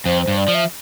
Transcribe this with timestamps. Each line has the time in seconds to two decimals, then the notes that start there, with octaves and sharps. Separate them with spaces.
0.06 F2 C5
0.22 C5
0.28 G2
0.37 D5
0.48 F3
0.54 E5